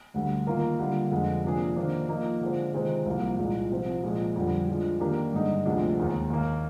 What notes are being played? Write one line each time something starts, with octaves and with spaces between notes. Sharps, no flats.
D2 D3 G3
D#3 A#3 F4 A#4
D3 G3 A#3 F4
F2 D3 G#3
C3 F3 A#3 D4 G#4
D#3 A#3 D4 F4 C5
F3 A#3 D#4
D3 G#3 D4 F4 C5
C3 D#3 G#3 C4 F4
C2 C3 F3 A#3
C2 A#2 G#3
C3 F3 C4
A#2 F3 G#3
F2 D3 G3
F3 G#3 D4
D#3 A#3 D4 G4 A#4
G2 D3 G#3 D#4
D2 C3 F3 G#3 D4
D#2 D#3 G#3
D#2 D#3 A#3